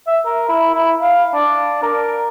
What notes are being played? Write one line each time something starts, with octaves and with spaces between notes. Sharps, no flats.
E5
A#4
E4
E4
F5
D4
A#4